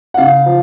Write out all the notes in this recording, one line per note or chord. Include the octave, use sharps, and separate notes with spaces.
F#5
C#3 F5
F3